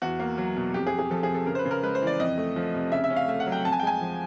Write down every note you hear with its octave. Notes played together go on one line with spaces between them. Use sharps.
E2 F#4
A#3
F#3
B2
F2 G4
G#4
F2
G#4
F3 A4
G#4
C3
A4
C#3 A#4
C5
B4
C#3
A#4
G#3 B4
C5
E3
D5
F2 D#5
A3
F3
C3
C#3 E5
E5
C#4
F5
A3 E5
F#5
F#3
G5
F2 A5
G#5
G5
G#3 G#5
F3